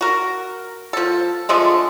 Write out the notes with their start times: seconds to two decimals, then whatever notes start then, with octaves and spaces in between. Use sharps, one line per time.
0.01 F#4 A#4
0.93 F3 A4
1.49 D3 F3 G#3 A3